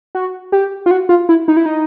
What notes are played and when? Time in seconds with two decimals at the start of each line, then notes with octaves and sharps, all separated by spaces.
0.15 F#4
0.52 G4
0.86 F4
0.91 F#4
1.09 F4
1.29 E4
1.48 D#4
1.57 E4
1.66 D#4